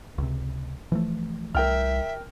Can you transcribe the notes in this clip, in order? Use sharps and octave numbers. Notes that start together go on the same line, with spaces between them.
C#2 C3
E3 F3 A3
C2 A#4 E5 G5 F6